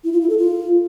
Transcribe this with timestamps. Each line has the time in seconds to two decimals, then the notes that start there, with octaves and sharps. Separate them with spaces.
0.04 E4
0.13 F4
0.21 E4
0.30 A4
0.38 F4